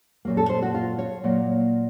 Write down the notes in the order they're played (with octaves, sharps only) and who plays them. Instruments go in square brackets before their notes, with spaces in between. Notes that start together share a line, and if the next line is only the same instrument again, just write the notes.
[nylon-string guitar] A#2 F#3 A#3
A4
C5
F#4
F4
C#5
A#2 F#3 A#3